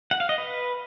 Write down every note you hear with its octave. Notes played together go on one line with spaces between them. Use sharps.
F#5
F5
D#5
B4